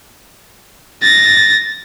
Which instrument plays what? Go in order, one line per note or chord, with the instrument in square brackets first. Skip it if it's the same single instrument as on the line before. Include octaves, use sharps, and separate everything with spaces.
[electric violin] A6 A#6